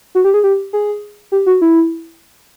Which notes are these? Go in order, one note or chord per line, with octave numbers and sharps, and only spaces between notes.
F#4
G4
G#4
G4
G#4
G4
F#4
E4